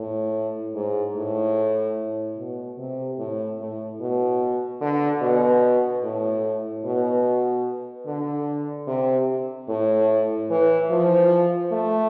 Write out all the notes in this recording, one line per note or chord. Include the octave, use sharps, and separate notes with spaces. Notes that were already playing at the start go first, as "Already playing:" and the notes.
Already playing: A2
G#2
A2
B2
C3
A2
A2
B2
D3
B2
A2
B2
D3
C3
A2
E3
F3
A3